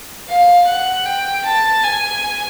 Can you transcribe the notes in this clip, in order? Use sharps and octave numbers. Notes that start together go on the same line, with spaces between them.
F5
F#5
G5
A5
G#5